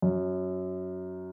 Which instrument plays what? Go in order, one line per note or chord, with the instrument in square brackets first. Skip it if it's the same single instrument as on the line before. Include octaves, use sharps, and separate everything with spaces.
[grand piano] F#2